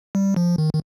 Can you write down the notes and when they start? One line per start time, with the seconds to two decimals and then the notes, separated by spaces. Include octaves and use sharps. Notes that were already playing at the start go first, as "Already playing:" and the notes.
0.15 G3
0.36 F3
0.58 D#3
0.73 D#3